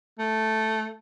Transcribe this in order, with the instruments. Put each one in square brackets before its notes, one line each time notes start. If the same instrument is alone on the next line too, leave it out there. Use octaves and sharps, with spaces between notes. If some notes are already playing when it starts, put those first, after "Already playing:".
[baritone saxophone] A3